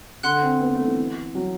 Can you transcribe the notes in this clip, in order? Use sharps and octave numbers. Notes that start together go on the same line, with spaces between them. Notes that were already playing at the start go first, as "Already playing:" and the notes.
D3 F#5 C6 F#6
C4
B3
A3
E3
F#3